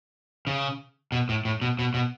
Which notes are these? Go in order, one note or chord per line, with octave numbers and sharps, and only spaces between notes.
C#3
B2
A2
A2
B2
B2
B2